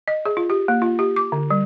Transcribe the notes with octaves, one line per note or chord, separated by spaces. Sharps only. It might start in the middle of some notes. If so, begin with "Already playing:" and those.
D#5
G#4
F4
G4
A#3
F4
G4
D6
D3
G3